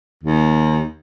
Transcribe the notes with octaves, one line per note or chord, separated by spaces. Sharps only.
D#2